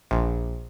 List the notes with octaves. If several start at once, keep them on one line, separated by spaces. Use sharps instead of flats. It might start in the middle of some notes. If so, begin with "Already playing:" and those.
A#1